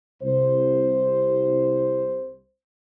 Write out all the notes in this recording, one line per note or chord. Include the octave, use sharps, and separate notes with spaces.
C2 C5